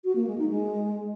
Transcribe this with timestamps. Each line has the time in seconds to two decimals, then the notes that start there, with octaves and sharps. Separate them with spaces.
0.04 F#4
0.16 A#3
0.27 G#3
0.38 D#4
0.49 G#3